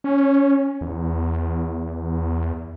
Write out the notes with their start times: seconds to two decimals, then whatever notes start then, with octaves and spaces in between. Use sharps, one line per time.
0.04 C#4
0.81 E2